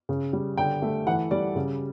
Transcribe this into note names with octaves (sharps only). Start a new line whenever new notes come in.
C#3
G3
D3 G5
A3
E3 F#5
G3 D5
C#3